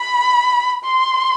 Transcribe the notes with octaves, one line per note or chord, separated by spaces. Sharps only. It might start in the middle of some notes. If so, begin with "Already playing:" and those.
Already playing: B5
C6